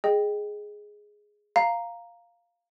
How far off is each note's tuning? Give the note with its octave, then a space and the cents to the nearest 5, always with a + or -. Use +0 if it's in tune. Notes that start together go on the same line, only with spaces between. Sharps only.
G#4 +0 D#5 -10 G5 +5
F5 +0 A#5 +0